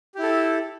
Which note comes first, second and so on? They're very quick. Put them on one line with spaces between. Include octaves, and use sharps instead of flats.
G4 E4 A4